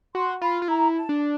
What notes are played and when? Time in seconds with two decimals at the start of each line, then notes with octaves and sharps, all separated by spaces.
0.14 F#4 C6
0.42 F4 B5
0.62 F4
0.68 E4 A#5
0.95 A5
1.09 D4